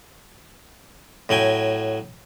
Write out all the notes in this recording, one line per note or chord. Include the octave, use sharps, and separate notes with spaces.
A2 F#3 G5 G#5